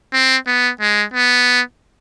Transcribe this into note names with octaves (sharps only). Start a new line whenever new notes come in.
C4
B3
G#3
B3